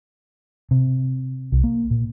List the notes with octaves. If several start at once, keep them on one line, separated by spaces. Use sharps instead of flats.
C3
C2
A#3
A#2